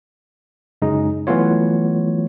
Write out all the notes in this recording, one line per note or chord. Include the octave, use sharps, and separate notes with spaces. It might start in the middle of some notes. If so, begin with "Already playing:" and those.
F#2 C#3 G#3 D#4
E3 F#3 A3 B3 F4 C#5